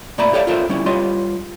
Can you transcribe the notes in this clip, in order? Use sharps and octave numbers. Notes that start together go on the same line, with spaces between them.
A#2 A3 D5 E5 A#5 B5
G4 A4 C#5 D5 E5 F5
F4 A4 A#4 C5 E5
G3 C#4 E4
G3 F4 C#5 D#5 C6